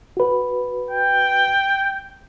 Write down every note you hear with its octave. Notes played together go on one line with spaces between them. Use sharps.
F#4 B4
G5